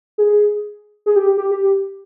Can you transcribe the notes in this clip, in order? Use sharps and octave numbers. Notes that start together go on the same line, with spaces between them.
G#4
G#4
G4
G4
G4